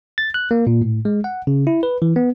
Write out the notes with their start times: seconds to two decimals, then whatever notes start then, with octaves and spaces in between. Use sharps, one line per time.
0.18 A6
0.34 F#6
0.51 A#3
0.67 A#2
0.82 A2
1.05 G#3
1.24 F#5
1.47 C#3
1.67 E4
1.83 B4
2.02 E3
2.16 B3